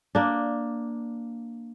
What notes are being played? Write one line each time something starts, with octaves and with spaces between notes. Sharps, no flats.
A#3 D4